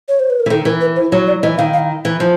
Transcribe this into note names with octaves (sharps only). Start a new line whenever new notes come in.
C#5
C5
B4
A#4
E3
D#3 A4
E3 A#4
B4
C5
F#3 C#5
D5
E3 D#5
D#3 F5
F5
E3
F3